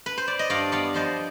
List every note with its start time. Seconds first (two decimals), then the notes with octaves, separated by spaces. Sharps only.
0.06 B4
0.17 C5
0.28 D5
0.39 D#5
0.50 G2 D5 F5
0.72 B3 D5 F5
0.94 F3 C5 D#5